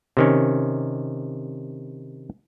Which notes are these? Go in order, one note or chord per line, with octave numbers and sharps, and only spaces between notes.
C3 D#3 C#4